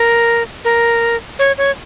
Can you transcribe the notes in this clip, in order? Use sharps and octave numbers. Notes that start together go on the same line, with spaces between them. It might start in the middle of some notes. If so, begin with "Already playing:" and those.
Already playing: A#4
A#4
C#5
C#5